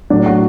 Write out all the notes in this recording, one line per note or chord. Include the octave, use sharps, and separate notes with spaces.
A2 F#3 D4
F#4